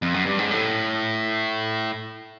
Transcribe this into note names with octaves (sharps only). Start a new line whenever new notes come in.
F2
F#2
G2
G#2
A2